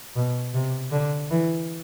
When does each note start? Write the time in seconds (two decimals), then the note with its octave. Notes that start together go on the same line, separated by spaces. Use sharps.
0.15 B2
0.54 C3
0.92 D3
1.30 E3